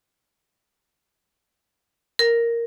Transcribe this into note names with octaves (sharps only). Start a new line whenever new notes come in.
A#4